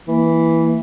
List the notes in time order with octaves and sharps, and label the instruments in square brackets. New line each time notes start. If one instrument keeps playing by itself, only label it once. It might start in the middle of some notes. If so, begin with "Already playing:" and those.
[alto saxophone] E3 [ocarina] A#3